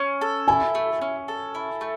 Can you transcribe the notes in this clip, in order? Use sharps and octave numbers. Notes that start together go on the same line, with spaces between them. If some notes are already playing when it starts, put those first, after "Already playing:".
Already playing: C#4
A4
E4 G#5
A3
C#4
A4
E4
A3